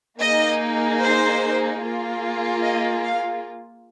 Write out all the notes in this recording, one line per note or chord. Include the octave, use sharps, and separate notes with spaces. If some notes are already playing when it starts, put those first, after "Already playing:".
A#3 D#4 G#4 D#5
C5
A#3 F4 G#4
D#5
F5